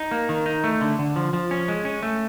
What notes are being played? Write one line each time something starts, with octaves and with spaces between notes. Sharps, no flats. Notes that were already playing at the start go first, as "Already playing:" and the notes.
Already playing: D#4
A#3
D#3
D#4
A3
D3
D3
F3
F3
C#4
G#3
C#4
A3